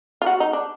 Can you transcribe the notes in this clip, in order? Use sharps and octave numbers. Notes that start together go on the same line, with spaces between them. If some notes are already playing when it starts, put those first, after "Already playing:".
F4
F#4
D#4
D4